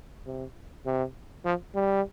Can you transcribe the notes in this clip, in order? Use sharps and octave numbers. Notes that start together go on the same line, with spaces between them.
C3
C3
F3
G3